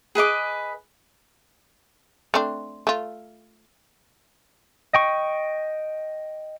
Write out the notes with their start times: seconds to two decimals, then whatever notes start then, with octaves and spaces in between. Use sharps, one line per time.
0.15 G#4 B4 D#5 D6
2.34 A3 C4 D4
2.87 A3 F4
4.93 D#5 G5 C#6